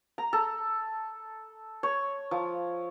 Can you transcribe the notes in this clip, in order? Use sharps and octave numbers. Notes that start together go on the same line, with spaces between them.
A#5
A4
C#5
F3